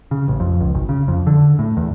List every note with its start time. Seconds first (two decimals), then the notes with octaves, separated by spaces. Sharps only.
0.11 C#3
0.28 A1
0.40 F2
0.60 C#2
0.74 G#1
0.89 C#3
1.08 F2
1.27 D3
1.59 A2
1.77 E2